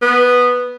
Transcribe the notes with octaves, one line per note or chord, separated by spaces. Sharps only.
B3